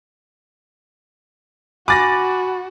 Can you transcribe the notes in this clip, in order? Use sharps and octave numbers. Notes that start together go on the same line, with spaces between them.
F#4 G#5 B5 D6 F#6 A6 A#6